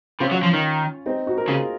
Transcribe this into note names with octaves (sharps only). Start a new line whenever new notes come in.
C3 C#4 F4
F#3
F3
D#3
C4 D#4
D#4 F#4
F#4 A#4
C#3 F4 G#4